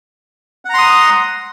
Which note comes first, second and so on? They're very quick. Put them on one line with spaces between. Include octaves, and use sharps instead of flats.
F#5 A#5 C6 D#6